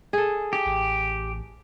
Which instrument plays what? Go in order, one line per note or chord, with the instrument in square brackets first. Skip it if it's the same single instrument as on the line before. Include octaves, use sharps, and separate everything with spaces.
[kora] G#4 A4
[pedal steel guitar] G4
[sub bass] A1